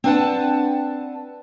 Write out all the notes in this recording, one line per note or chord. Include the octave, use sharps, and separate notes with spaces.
C4 D4 B4 F#5 A5